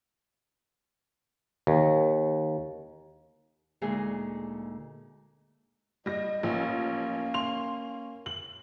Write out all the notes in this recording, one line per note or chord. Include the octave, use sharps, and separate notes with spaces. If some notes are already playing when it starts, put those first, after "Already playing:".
D#2
D2 A#2 G#3 D#4 G#4 A#5
G3 D#5 A#6
A1 F3 A#3 C#4
C6 F7
F#7